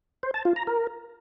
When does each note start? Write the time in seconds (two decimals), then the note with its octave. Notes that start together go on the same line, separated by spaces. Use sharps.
0.23 C5
0.34 A5
0.45 F4
0.56 A#5
0.67 A#4